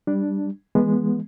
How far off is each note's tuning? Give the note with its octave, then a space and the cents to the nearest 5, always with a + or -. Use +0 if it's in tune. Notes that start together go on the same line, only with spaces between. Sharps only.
G3 +0 D4 +0
E3 +20 G#3 +0 B3 -20